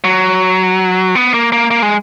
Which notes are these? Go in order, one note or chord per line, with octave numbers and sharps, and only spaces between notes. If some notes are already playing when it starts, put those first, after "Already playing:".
F#3
B3
A#3
A#3
A#3
G#3